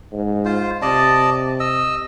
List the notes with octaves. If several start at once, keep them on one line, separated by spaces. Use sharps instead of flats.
G#2
F4 C5
C3 D5 D#5 A5
D#5 E6